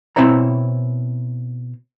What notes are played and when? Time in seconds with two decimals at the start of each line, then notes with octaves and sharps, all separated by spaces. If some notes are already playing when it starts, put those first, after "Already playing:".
0.16 B2 C4 E4 C5 C#5 A#5